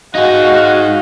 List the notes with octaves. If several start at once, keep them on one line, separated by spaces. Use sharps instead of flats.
D#4 F#4 G#4 F5